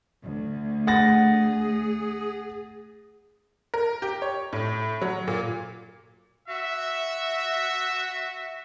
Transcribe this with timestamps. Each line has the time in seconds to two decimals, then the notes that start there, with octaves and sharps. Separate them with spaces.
0.23 D2
0.87 G#4 F#5 A6 A#6
3.74 A#4
4.02 G4
4.22 C#5
4.53 A2
5.01 F#3
5.28 A#2
6.49 F#4 E5